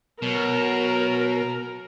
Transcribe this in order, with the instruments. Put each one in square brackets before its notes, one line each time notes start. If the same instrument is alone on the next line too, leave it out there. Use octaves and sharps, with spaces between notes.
[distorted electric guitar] B2 [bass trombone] F#3 [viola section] A#4